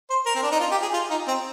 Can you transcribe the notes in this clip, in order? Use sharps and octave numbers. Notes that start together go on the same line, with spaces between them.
C5
A#4
C4
D4
D#4
F4
G4
G#4
F4
D#4
C4